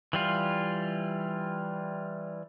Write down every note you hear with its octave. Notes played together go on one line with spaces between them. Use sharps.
E3 G3 F4